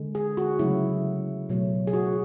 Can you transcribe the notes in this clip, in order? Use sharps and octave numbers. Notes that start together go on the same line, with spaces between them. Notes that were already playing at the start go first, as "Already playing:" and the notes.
Already playing: D3 G#3
G#4
F#4
C#3 F#3 A3 E4
B2 F#3 A3
G#4
F#4